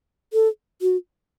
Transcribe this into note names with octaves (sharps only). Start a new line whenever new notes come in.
A4
F#4